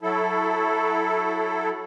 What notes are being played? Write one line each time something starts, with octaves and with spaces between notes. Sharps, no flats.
F#3 E4 A4